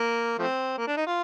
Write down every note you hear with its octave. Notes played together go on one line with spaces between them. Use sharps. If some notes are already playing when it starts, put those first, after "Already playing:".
Already playing: A#3
F3 A3 C4
A#3
D4
D#4
F4